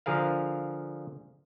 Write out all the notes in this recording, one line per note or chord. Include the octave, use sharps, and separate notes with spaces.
D3 F3 G#4 A#4 F5